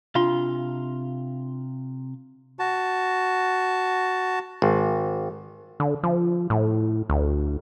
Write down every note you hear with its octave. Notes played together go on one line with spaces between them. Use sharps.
C3 D4 F4 F5 C6
F#4 A5
G#1
D3
F3
A2
D2